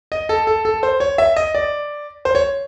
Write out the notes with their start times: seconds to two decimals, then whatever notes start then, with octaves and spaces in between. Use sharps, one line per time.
0.12 D#5
0.29 A4
0.47 A4
0.65 A4
0.83 C5
1.00 C#5
1.18 E5
1.36 D#5
1.55 D5
2.25 C5
2.35 C#5